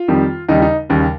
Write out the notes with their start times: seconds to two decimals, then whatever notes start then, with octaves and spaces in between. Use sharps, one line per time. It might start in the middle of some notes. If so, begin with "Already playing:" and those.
Already playing: F4
0.08 F2 D#3 G3
0.49 D#2 C#3 G3 D#4
0.62 D#4
0.89 D#2 C#3 G3